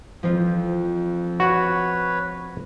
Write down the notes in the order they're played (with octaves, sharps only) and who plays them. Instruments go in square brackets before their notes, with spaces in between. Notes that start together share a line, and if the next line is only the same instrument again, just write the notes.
[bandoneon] F2 [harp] F3 C4 F4
[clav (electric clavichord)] F#4 [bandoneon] B4 C#5